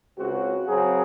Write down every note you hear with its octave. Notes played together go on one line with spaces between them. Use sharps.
C#2 C#3 G#3 C4 F#4
F#2 C#3 F#3 C4 G#4